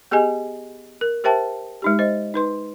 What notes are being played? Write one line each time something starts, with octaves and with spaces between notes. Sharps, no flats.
B3 G4 G#4 D#5 G#5
A#4
G4 A#4 C5 E5 G5 A5
G#3 D#4 G4
C5 D#5
D#4 B4 C6